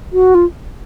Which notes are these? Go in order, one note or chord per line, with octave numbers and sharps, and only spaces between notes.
F#4
F4